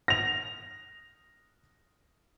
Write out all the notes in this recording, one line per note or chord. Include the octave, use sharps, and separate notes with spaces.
A#6 F7